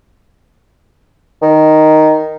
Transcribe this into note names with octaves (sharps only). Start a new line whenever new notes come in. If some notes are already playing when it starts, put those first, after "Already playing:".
D#3